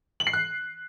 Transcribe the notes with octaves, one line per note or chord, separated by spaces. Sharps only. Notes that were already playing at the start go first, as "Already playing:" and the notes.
F#7
C7
F#6